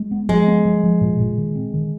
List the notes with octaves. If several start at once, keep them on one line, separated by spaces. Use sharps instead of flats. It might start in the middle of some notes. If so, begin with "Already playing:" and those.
Already playing: G#3
B3
F3 G#3
B3
F3
F3
A#2
A#2
D#3
C4
D#3